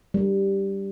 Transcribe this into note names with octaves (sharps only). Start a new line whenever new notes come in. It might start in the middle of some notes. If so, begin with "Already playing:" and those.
G3